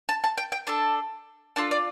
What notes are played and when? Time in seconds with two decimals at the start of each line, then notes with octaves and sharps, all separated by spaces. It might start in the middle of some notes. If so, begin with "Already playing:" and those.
0.09 A5
0.24 A5
0.38 G5
0.52 G5
0.67 D4 A4 A5
1.56 D4 F4 A4 A5
1.71 D5